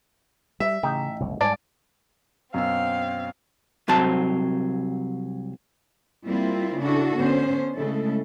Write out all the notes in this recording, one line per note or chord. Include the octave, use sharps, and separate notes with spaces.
G3 E5
A1 C#3 D#4 G5
F#1 C2
G#2 G3 D5 G#5 A5
F#2 B2 C4 F5 E6
C2 F#3 C4 A5
G3 A#3 C4 E4 F4
C#3 D4 E4 F#4 A4
D3 B3 C#4 C5
C#3 G#3 A3 E4 A4